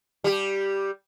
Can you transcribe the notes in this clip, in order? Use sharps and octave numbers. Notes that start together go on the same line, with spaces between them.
G3 G4